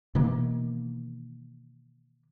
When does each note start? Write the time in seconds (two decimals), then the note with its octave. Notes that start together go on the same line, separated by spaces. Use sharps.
0.15 B2 D#3 E3 A#3